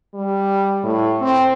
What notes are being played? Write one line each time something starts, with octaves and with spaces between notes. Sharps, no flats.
G3
A2
C4